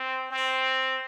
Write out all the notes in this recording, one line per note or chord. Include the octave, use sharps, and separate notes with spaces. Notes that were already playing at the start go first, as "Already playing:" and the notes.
Already playing: C4
C4